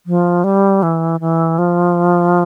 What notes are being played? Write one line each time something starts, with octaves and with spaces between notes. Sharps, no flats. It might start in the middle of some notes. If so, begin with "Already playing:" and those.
F3
G3
E3
E3
F3